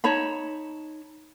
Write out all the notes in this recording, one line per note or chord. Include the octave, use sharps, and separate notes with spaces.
D#4 C#5 A5 B5